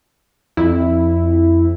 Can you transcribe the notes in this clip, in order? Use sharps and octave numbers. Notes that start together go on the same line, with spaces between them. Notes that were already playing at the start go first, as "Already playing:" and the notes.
F2 E4